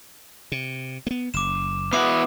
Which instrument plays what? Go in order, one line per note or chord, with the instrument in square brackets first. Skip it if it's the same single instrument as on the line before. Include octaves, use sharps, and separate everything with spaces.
[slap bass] C3
A#3 B3
[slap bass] F#1 [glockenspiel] D6 E7
[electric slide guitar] B3 E4 F#4 [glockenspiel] D6 D#6 C7